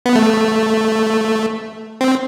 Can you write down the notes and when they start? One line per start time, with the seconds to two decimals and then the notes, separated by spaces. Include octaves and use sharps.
0.06 B3
0.15 A3
2.01 C4